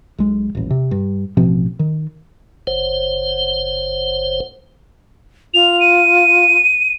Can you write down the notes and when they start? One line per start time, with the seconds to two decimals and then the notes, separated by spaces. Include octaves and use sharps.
0.18 B1 G#3
0.55 D#1 A1
0.70 C3
0.91 G2
1.37 A1 B2 F3 C4
1.79 D#3
2.67 F#1 C5
5.54 F4 F7
5.80 D#7